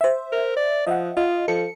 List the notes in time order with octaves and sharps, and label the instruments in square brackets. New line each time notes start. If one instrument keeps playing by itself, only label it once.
[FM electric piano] C5 E5
[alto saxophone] A#4
D5
[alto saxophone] F3 [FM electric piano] D#5 E5 F#5
[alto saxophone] F4 [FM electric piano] D#5
[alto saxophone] F3 [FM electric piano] A4 C#7